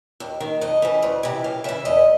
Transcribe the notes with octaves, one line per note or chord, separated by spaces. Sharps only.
D#2
D#3
F2 D#5
C#3 E3
D2
C3 E3
F#2 F5
C#3 E3 E5
E2 D#5